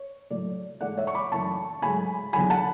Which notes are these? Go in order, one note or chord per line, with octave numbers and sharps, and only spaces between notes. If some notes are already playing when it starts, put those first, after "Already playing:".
Already playing: C#5
A2 F#3 A3 D5
G#2 E3 A3 D5 F#5
C#5 E5
C#6
B5 D6
F#2 E3 A3 A5 C#6
G#2 F#3 A3 G#5 B5
E2 D3 F#3 G#5 B5
F#5 A5